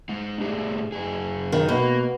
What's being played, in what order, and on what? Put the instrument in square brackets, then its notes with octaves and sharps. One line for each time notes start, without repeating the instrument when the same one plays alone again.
[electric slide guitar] G#3 D#4
A2 G4 G#4
F#2 G#4
[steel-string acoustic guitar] D#3
[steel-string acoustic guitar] B2 [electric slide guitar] A#3